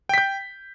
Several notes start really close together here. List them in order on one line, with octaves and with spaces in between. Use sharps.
G5 B6 G6